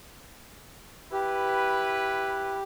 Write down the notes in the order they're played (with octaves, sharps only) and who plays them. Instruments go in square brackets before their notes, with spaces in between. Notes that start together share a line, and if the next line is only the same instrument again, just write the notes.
[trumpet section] E4 B4 [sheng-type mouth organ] G4